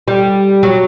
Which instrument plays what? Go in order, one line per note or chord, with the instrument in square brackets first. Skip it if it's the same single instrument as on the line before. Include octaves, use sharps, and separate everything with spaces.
[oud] G3
F#3